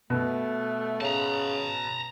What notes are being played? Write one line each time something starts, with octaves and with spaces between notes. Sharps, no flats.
B2 A3
C#3 A5 A#5